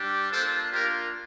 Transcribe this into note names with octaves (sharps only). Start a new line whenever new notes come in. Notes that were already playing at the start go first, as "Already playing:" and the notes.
Already playing: G3 D4 G4
A#3 D4 F4 A4 C5
A#3 D4 F4 G4 A#4